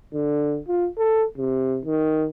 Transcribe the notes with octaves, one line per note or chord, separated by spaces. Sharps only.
D3
F4
A4
C3
D#3